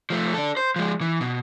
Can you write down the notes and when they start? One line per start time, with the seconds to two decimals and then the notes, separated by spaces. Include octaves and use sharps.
0.10 F3 A3
0.34 D4 A4
0.57 C5
0.76 F3 G#3
1.01 E3
1.21 B2